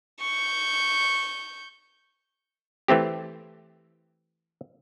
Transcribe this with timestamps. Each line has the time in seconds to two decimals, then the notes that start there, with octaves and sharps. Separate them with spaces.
0.21 C#6 G6
2.88 E3 A3 C4 G4